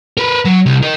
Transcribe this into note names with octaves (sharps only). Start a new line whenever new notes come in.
A#4 B4
F#3
C2
A#4 D#5